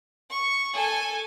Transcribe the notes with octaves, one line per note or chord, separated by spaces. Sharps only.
C#6
A4 G#5